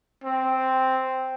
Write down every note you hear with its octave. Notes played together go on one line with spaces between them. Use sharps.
C4